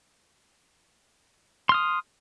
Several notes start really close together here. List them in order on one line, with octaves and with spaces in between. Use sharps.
C6 F6 D#6